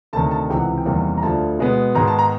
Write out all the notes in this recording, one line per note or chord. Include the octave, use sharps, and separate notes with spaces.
D2 C3 D#3 A5
A5
C#2 C3 E3 G5
F#5
G5
E2 C3 D#3 G3 A#3
A#5
D2 D3 F3 A5
B2 G#3 B3
G#2 D#3 G#3 B3 A#5
A5
A#5